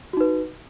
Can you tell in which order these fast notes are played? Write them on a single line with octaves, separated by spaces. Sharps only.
F#4 D#4 B4